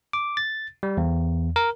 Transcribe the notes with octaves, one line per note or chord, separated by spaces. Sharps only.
D6
A6
G3
E2
A#4